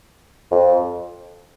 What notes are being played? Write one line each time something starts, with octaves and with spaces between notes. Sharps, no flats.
F2